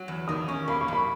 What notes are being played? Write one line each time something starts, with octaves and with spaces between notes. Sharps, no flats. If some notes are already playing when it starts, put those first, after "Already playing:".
Already playing: F#3
E2
D#3 D#6
C#4 C#6
A#3 B5
C#6
F#2 B5